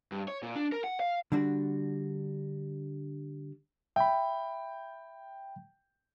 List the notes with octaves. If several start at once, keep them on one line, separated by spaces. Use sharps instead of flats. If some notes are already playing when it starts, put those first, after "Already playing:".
G2
C#5
A#2
D4
A#4
F#5
F5
D3 G3 D4 F#4
E5 G5 B5